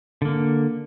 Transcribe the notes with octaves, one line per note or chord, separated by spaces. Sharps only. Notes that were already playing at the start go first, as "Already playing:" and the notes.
D3 A#3